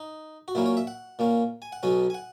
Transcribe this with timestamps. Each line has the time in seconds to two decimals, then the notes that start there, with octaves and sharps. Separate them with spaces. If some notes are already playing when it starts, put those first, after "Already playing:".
Already playing: D#4
0.48 F#4
0.55 A#2 F#3 A#3 C#4 E4
0.66 C#5
0.77 E5
0.87 F#5
1.19 A#2 A#3 C#4
1.62 G#5
1.72 F#5
1.83 B1 B2 F#3 C#4 G#5
2.10 G#5
2.14 F#5